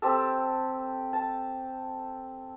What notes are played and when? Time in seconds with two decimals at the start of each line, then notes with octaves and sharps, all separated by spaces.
0.02 C4 G4 A4
1.13 A5